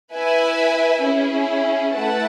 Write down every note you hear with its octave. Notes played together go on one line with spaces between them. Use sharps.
E4 B4 E5 G#5
C#4 E4 G#4
A3 E4 B4 F#5 A5